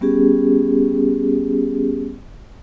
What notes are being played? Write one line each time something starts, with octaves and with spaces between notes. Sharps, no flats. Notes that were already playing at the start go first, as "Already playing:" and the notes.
G3 B3 C#4 G4 G#4